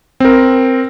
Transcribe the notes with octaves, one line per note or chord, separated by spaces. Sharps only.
C4 A#4